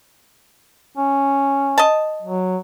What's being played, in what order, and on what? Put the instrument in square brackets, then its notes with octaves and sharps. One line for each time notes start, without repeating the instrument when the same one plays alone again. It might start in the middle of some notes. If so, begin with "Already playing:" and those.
[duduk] C#4
[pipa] D#5 A5
[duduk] F#3